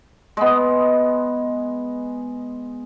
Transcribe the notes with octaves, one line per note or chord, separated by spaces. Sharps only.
G#3 B3